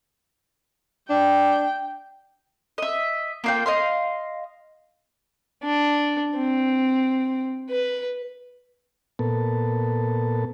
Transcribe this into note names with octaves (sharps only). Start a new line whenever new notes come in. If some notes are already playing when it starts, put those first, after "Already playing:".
D4 G5
D#5 E5
A#3 F4 G5
D#5 F5 C6
D4
C4
B4
A#2 B3 A4